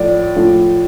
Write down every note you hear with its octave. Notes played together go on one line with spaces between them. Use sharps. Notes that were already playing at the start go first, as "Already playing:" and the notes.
Already playing: A2 F3 D5
A2 F3